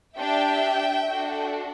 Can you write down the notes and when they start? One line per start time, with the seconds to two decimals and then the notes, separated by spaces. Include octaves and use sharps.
0.17 D4 G4 E5 G5
1.08 D4 F#4 A4